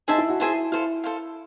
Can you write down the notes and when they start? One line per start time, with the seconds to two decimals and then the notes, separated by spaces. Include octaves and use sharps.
0.08 D#4 G#4 C5 E5 A5
0.18 E4
0.29 F#4
0.40 E4 G#4 C5 E5 A5
0.72 E4 A4 C5 F5
1.04 A4 C5 F5